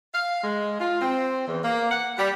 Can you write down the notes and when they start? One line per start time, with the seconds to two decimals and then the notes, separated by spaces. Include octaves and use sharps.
0.14 F5
0.44 G#3
0.80 F4
1.01 C4
1.48 E2
1.64 A#3
1.91 F#5
2.17 G3